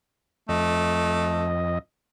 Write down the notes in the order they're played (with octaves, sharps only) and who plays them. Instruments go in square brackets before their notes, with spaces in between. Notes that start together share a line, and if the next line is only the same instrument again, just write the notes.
[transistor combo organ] F2 D#5 [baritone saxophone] A3